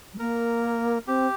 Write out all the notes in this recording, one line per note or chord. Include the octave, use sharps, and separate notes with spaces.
G3
A#3 A#4
C4 G4